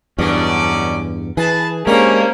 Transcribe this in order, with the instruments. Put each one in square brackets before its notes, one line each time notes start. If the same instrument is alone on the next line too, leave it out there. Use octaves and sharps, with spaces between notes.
[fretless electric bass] E2 G2 [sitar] B2 D3 [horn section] F#3 C#4 D5
[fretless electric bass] E3 [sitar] G#4 [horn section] B4 A5
[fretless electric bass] G#3 [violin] A#3 C5 [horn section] C#4 [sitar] D4 G4